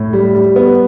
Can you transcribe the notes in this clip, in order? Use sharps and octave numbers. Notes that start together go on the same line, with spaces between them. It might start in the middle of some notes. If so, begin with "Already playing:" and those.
Already playing: A2
G3
G3
B3